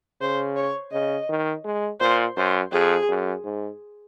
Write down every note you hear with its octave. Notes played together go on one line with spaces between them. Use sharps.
C#3 C5
C#5
C#3 D#5
D#3
G#3
A#2 C5
F#2 C5
F2 G#4
F#2
G#2